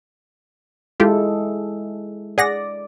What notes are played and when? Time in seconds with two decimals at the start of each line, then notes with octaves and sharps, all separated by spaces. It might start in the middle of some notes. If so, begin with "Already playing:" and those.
1.00 G#3 E4 F4 G4 A4
2.38 G#4 D5 F#5 A#6